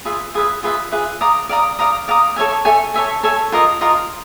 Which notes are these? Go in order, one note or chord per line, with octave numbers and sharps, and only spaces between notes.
F4 G#4 B4 E5
F4 G#4 B4 E5
F4 G#4 B4 E5
F4 G#4 B4 E5
D5 F5 A#5 D#6
D5 F5 A#5 D#6
D5 F5 A#5 D#6
D5 F5 A#5 D#6
A4 C#5 E5 G#5
A4 C#5 E5 G#5
A4 C#5 E5 G#5
A4 C#5 E5 G#5
F4 A#4 D#5
F4 A#4 D#5